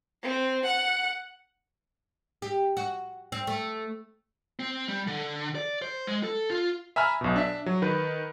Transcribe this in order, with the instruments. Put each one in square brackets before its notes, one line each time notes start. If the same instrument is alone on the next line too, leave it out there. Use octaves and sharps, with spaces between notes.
[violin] C4
F#5
[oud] G4
F#4
C4
A3
[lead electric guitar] C4
G3
D3
D5
C5
G#3
A4
F4
[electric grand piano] E5 G#5 A#5 B5 F6
B1 B2
D4 E5
F#3
D#3 B4